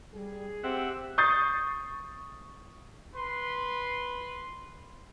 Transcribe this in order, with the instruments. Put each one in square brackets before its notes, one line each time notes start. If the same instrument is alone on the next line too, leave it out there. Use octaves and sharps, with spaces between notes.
[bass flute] G3 [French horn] G#4
[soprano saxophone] C4 [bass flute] G4 [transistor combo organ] E5 F#5
[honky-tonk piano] C#6 D#6 G6 A6 C7
[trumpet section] B4 C6